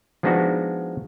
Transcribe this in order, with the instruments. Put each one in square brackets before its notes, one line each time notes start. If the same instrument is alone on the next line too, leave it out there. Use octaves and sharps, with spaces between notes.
[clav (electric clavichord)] F3 G#3 B3 D4 D#4 F#4